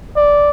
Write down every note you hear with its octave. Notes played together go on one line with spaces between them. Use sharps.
D5